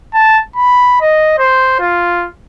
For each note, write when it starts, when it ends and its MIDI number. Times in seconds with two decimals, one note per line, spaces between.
0.14 0.40 81
0.56 1.01 83
1.01 1.33 75
1.38 1.77 72
1.80 2.28 65